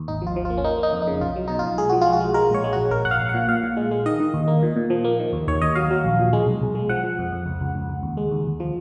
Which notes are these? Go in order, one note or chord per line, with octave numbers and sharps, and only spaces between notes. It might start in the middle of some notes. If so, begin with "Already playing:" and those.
Already playing: D#2
G#1 D#4
F3 F4
F3
F4
A#3
C#4
A#3 D#4
A#3
D#4
F2
D#4
C#3
B1 F4
F#3
B2 D#4
F4
B1
G#3 G#4
F3 F#4
G#3 F4
F#4
G#3
G#3 A#4
A#1 C#5
G#3
F#4
A#1
A#1 A#4
A#1 F#5
F5
A#1
F#5
A#2
A#2 F5
A#2
G#3
G#3
D#3 D#5
D#3
D#2
A#3
A#2
A#2
F3
A#3
D#3
D#2
D#2 C#5
D#2 D#5
F#3 F5
F#3
A#1
A#2
G#3
B1
B1
G#3
F3 F#5
F3
F2
F2
C#2
C#2
C#2
C#2
D#2
G#3
D#2
D#2
F3